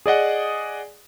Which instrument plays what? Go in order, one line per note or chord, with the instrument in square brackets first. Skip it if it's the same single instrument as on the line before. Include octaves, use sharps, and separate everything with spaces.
[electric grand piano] G#4 D5 D#5 F#5